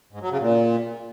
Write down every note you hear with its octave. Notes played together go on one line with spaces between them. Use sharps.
G#2
F#3
C#3
A#2